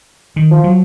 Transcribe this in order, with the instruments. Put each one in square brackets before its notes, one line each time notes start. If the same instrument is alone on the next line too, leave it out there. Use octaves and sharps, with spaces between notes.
[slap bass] D#3
[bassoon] F3
[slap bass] F#3